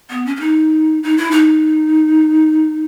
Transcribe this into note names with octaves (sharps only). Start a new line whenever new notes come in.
B3
C#4
C#4
D#4
D#4
E4
D#4